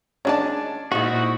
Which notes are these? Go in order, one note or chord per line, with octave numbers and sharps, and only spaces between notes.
D#3 G#3 C#4 D4 D5 A5
A#2 F3 G#3 D#4 E4 F#4